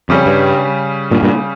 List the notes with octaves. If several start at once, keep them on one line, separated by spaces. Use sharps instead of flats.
F2 C#3 G3 C#4
G2
G2 A#2
G2 A#2